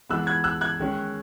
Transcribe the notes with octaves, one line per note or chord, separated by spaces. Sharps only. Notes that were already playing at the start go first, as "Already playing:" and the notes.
E3 G#3 B3 E6 F#6
F#6 G#6
E6 F#6
F#6 G#6
D#3 G#3 C#4